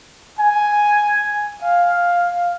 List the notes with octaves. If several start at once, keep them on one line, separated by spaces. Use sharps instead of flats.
G#5
F5